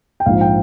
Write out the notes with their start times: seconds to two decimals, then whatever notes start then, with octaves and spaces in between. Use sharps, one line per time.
0.20 G5
0.26 A#1 G#2 F3 F5
0.41 G5